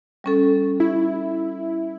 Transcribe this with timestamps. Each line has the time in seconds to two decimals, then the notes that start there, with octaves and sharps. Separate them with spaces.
0.24 G3 C#4 A4
0.80 E4